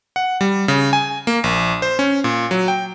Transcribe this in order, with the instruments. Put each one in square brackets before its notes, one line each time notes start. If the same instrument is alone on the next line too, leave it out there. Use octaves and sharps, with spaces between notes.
[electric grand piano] F#5
G3
C#3
G#5
A#3
A#1
C5
C#4
A#2
F#3
G5